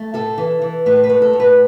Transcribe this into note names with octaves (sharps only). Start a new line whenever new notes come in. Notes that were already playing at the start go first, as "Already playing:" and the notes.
Already playing: A3
A2 A4
E3
E3
A2 B4
B4
A3
A4
A2
B4